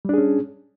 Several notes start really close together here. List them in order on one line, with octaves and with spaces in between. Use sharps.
G3 D4 G#4 C#4